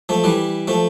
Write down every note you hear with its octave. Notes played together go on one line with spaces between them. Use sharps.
F3 A3
E3 G3
F3 A3